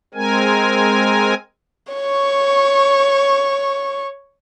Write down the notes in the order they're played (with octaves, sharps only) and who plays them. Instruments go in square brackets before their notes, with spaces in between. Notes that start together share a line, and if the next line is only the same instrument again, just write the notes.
[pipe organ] G#3 C4 A#4 G#5
[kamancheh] C#5 C#6